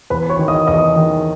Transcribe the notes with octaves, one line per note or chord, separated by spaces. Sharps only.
E2 B4 B5
C#5 C#6
D#3
D#5 D#6
E2 D#5 D#6
D#3